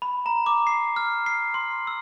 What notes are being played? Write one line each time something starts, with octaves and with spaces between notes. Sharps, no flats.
B5
A#5
D6
C7
F6
C7
C6
E6